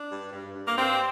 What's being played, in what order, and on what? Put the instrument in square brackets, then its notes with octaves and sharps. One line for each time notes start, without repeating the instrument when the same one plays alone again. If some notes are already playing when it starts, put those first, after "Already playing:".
Already playing: [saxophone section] D4
G2
G2
G2
A#3
G2 C4